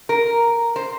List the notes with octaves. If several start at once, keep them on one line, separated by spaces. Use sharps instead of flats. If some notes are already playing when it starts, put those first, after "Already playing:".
A#4
C5